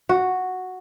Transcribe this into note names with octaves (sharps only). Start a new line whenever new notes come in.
F#4